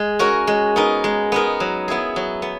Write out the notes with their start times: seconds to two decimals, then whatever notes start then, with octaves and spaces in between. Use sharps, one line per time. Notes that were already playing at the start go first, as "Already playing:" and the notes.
Already playing: G#3
0.19 C#4 F#4 A#4
0.47 G#3
0.76 B3 D#4 A#4
1.04 G#3
1.32 B3 D#4 A#4
1.60 F#3
1.88 B3 E4 G#4
2.16 F#3
2.42 B3